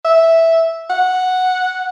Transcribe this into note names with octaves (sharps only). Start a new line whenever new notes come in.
E5
F#5